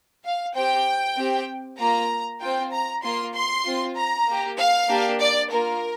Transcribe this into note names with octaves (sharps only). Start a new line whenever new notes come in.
F5
C4 G4 G5
C4 G4
A#3 F4 A#5
C4 F4 G5
A#5
A#3 F4 C6
C6
C4 F4
A#5
A#3 G4
F5
A#3 D4 G4
D5
A#3 F4 A#4